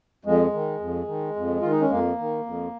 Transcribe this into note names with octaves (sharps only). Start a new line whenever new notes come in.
F2 G#3
D#3
F2
D#3
F2
D#3 F4
D#4
C#4
F2 A#3
D#3
F2